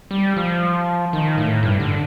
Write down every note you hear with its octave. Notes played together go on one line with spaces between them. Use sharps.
G3
F3
D#3
A2
G2
D3